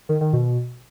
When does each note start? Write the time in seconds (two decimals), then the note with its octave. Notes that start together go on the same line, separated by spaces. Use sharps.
0.09 D#3
0.21 D#3
0.33 B2